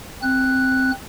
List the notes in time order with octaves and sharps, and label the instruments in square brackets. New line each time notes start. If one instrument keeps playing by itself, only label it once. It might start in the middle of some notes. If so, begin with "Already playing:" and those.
[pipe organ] C4 F#6